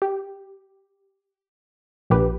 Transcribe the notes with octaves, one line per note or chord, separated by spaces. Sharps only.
G4
A#1 A#2 G4 B4